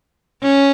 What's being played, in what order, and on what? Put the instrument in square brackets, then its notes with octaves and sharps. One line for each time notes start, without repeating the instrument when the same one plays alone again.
[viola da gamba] C#4